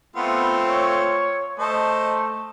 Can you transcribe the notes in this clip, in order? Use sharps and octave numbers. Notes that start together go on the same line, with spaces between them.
A3 B3 C4 F4
C#5
A3 C5 D#5 A5